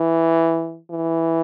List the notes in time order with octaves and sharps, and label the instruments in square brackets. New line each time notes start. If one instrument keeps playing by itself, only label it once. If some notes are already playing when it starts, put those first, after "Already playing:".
Already playing: [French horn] E3
E3